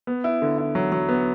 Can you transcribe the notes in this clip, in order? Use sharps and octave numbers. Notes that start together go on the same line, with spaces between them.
B3
E4
D3
E4
F#3
F#3
B3